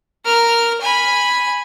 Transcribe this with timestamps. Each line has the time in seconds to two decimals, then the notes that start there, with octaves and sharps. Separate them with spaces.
0.25 A#4 F6
0.81 G#5 B5